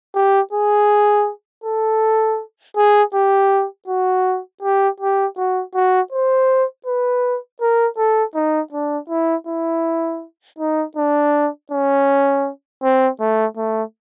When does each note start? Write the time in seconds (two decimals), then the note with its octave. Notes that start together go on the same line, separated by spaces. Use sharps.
0.15 G4
0.53 G#4
1.64 A4
2.77 G#4
3.14 G4
3.88 F#4
4.63 G4
5.00 G4
5.38 F#4
5.75 F#4
6.12 C5
6.86 B4
7.61 A#4
7.98 A4
8.35 D#4
8.72 D4
9.10 E4
9.47 E4
10.59 D#4
10.97 D4
11.72 C#4
12.83 C4
13.20 A3
13.57 A3